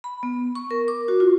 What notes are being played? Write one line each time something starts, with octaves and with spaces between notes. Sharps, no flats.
B5
B3
C#6
A#4
D6
F#4
F4